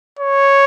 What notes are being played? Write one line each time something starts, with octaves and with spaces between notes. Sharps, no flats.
C#5